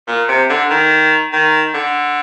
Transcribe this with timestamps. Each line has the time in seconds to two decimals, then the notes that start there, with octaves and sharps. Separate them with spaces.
0.07 A#2
0.28 C3
0.50 D3
0.70 D#3
1.32 D#3
1.74 D3